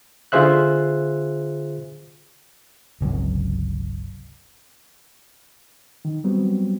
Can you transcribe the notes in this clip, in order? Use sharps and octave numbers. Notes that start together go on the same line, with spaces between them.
D3 F4 G#4 C5 E5 F#6
G1 C#2 C3 F#3
D#3
F#3 G3 B3 C4